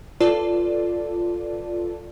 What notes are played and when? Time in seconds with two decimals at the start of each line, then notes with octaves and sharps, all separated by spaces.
0.20 F4 A4 B4 D5 A5